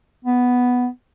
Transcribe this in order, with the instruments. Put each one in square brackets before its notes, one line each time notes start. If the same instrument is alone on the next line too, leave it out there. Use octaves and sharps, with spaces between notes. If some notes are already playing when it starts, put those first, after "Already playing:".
[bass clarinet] B3